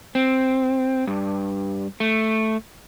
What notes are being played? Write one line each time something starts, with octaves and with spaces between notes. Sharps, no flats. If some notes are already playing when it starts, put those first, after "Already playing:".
C4
G2
A3